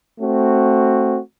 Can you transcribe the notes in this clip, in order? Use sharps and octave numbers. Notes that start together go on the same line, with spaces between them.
A3 C4 F#4